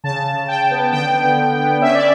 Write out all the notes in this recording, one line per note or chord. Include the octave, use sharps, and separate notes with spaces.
C#3 A5
C#3
C#3 G5
B3
D3 G5
B3
D3
B3
C#4 E5
D5